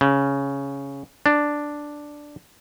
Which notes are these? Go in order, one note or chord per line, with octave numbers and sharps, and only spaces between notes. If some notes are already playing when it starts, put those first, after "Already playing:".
C#3
D4